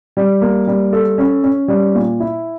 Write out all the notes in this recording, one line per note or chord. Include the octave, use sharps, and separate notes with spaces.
G3
A#3
G3
A4
C#4
C#4
G3
A#2
E4